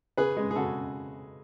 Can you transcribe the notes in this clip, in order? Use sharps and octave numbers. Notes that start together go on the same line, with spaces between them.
C#3 G#4 B4
G#3
G#4
C#3 F#4 A4